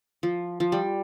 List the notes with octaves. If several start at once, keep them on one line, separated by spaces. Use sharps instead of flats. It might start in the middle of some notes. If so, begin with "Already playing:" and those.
F3
F3
G3